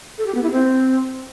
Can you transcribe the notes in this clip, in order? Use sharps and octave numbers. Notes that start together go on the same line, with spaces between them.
A4
G4
B3
E4
C4